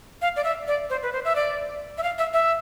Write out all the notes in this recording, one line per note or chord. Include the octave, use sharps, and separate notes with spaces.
F5
D5
E5
D5
C5
B4
C5
E5
D5
E5
F5
E5
E5